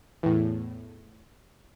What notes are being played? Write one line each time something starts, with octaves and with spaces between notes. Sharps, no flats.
E2 A2